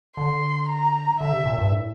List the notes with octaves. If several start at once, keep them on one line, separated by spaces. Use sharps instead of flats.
D3 C6
A#5
D3 E5
C3
A#2
G2
A2